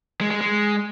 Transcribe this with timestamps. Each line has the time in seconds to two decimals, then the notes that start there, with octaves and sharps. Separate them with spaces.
0.21 G#3
0.31 G#3
0.41 G#3